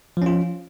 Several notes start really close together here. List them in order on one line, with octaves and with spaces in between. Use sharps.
F3 C#4 F4